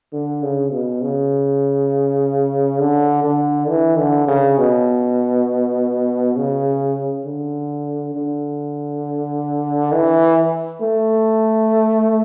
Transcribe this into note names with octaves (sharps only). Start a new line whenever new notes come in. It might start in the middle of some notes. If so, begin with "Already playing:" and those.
D3
C#3
B2
C#3
D3
D3
E3
D3
C#3
B2
C#3
D3
D3
E3
A3